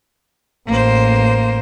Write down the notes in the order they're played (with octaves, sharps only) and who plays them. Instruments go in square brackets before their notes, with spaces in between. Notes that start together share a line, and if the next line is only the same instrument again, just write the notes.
[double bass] A1 [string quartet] A#3 C5